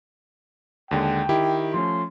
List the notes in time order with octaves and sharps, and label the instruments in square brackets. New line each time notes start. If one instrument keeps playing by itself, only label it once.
[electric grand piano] D#2 D3 G#3 [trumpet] G5
[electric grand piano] D#3 E4 G4
[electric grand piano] F3 A3 C#4 [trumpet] C6